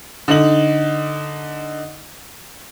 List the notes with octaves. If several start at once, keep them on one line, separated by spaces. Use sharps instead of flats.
D3 D#4 F#7